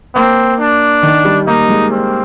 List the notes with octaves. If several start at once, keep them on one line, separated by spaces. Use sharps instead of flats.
A#3 C4
D4
D#3
G3
A#3 D#4
G#3
C4